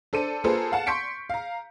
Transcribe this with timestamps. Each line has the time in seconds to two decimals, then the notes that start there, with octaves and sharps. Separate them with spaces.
0.13 D4 A4 C5 D#7
0.44 A#3 F4 G#4 A4 B4 C5
0.72 F5 F#5 A5
0.86 C6 C#6 G6 B6 C#7 D7
1.29 F5 A#5